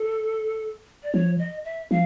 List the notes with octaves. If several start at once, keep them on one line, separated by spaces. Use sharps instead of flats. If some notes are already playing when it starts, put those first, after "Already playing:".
Already playing: A4
D5
F3 C#5
D#5
E5
F3 F5